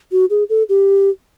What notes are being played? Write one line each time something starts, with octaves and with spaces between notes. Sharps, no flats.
F#4
G#4
A4
G4